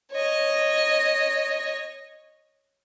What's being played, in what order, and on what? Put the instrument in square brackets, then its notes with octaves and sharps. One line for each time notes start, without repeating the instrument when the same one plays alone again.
[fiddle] C#5 D#5